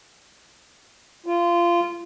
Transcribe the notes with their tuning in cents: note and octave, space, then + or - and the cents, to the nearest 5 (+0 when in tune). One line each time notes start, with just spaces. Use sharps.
F4 -20